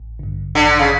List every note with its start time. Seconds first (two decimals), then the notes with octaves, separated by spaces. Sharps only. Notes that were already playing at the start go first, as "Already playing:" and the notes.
Already playing: A1
0.19 G2 D3
0.55 A1 D3
0.79 C#3